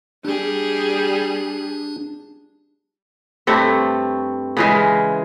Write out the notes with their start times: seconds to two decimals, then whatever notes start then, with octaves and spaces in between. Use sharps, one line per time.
0.25 G3 D4 G#4
3.47 G2 A3 C4
4.57 C#3 E3 G#3